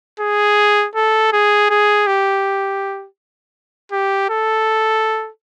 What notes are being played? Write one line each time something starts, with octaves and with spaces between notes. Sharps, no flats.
G#4
A4
G#4
G#4
G4
G4
A4